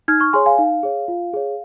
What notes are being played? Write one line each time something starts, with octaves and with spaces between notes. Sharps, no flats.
D#4 F6 G#6
C#6 F6
G#4 C#5 G#5 C6
F5 G#5
D#4 F5
G#4 C#5
F4
G#4 C#5